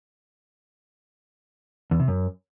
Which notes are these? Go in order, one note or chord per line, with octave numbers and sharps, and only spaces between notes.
E2
C3
F#2